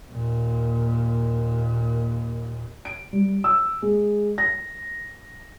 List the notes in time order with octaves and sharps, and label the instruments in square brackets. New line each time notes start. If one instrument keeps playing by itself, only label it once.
[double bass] D#2 A#2
[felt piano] D7
G3
E6
G#3
A#6